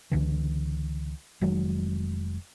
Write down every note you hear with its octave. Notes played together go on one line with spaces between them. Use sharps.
C#2 D3 E3
F1 D#3 F#3 G#3